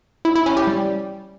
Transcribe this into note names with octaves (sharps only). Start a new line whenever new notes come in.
E4
E4
C#4
G4
G3